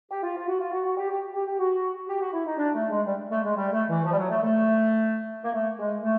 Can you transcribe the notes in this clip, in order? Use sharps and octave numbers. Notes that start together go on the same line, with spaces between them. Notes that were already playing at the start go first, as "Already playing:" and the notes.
G4
F4
F4
F#4
F4
F#4
F#4
G4
G4
G4
G4
F#4
G4
F#4
E4
D#4
D4
A3
G#3
G3
A3
G#3
G3
A3
E3
F3
G3
F#3
A3
A3
A#3
A3
G#3
A3